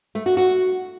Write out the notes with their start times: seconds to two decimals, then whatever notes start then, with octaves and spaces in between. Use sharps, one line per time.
0.15 A3
0.26 F#4
0.37 F#4